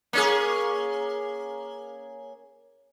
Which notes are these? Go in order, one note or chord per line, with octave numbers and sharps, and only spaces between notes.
A#3 C#4 G#4